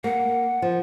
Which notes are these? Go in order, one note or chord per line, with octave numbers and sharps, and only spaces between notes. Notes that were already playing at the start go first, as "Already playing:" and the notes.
A#3 F#5
F3